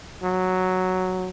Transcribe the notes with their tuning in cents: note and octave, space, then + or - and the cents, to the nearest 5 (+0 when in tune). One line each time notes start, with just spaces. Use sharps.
F#3 +0